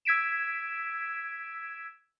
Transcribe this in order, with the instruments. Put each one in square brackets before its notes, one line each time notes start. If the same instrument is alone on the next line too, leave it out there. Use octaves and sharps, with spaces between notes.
[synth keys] E6 G#6 B6 D7 E7